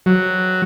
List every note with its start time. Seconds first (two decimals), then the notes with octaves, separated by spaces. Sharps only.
0.06 F#3